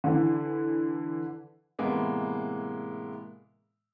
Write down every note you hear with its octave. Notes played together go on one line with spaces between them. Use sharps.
D3 E3
A2 C3 E3 G#3 A#3 B3